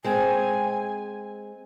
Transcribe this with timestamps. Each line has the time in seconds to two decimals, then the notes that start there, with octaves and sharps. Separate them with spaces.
0.04 G#3 C4 G#5